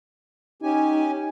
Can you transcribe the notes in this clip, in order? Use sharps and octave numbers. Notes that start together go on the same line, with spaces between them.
C#4 D#4 G4 G#5